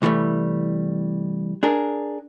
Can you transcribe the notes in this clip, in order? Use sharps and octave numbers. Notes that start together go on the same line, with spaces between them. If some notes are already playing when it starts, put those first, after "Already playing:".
C2 E3 F#3 G3 A3
D4 G#4 A#4